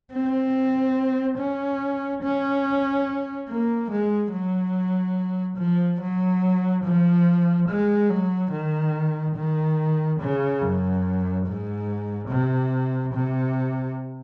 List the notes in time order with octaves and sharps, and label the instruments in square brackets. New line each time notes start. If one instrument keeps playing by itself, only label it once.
[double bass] C4
C#4
C#4
A#3
G#3
F#3
F3
F#3
F3
G#3
F#3
D#3
D#3
C#3
F#2
G#2
C3
C3